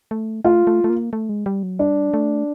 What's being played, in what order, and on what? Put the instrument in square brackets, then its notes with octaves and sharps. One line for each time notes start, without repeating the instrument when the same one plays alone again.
[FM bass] A3
[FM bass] A3 [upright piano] F4
[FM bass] A3
A3
A#3
A3
G#3
G3
F#3
[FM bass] G3 [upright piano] D4
[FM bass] A3